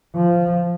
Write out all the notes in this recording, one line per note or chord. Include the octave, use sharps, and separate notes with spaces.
F3